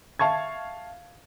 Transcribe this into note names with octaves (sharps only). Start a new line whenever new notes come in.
E5 F5 A5 C#6 G#6